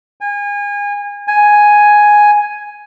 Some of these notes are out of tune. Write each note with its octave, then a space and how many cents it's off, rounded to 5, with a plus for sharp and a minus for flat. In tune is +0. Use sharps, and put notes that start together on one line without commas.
G#5 -30
G#5 +5